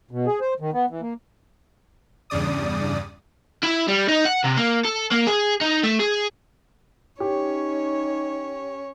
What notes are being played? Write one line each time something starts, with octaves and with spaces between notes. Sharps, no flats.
B2
G#4
C5
D#3
B3
E3
A#3
E2 G2 C#3 D5 D#6
E4
G3
D#4
F#5
C3
A#3
A4
A#3
G#4
D#4
A3
G#4
C#4 D#4 G4 C#5